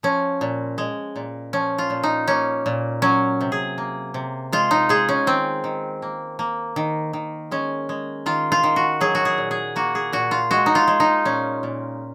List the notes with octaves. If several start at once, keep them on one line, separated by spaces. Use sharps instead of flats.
F3 C#4
A#2
G#3
A#2
F3 C#4
F4
A#2
D#4
A#3 C#4
A#2
F#3 C#4
C3
G#4
A#3
C3
G#3 F4
D#4
G#3 G#4
C#4
D#3 C4
D#3
A#3
A#3
D#3
D#3
G#3 C#4
G#3
D#3 F4
F4
D#3
F#4
F#3 G#4
F#4
G#4
A#2
G#4
A#3 F#4
G#4
A#2 F#4
F4
G#3 F#4
D#4
F4
G#3
D#4
A#2 C#4
A#2